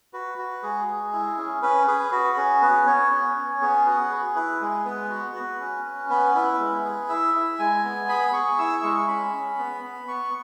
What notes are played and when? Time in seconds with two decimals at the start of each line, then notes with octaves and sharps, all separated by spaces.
0.13 F#4 B4
0.38 F#4
0.63 G#3 G#4
0.87 G#4
1.13 E4
1.37 C#4
1.62 C#4 B4
1.87 G#4 B4
2.12 F#4 B4
2.37 C#4 G#4
2.62 B3 B4
2.87 B3 C#5
3.11 C#4
3.36 C#4
3.61 B3 G#4
3.86 F#4 B4
4.11 G#4
4.36 E4 B4
4.61 G#3 G#4
4.85 B3 B4
5.10 F#4
5.35 F#4
5.60 C#4
5.85 C#4
6.09 B3 B4
6.35 E4 B4
6.60 G#3
6.84 G#4
7.09 E4 E5
7.34 E4
7.59 G#3 G#5
7.84 B3
8.09 G#4 B5
8.33 G#4 C#6
8.59 E4 E6
8.83 G#3 C#6
9.08 C#4 B5
9.33 C#4
9.58 B3
9.83 B3
10.08 B3 C#6